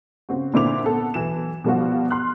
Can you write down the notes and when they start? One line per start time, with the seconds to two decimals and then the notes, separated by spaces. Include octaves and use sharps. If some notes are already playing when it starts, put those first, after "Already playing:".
0.29 C#3 C4 F#4
0.54 A#2 D3 C4 E4 D6 F7
0.84 B3 A4
1.14 B1 E3 E7
1.64 B2 F3 G3 F4 F#4
2.11 C6 F6 F#6